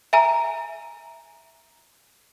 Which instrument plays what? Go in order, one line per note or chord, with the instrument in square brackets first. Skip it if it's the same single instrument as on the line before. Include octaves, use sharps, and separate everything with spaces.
[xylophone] E5 G#5 A#5